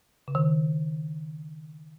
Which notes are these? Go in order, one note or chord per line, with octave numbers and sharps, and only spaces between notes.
C#3
D#3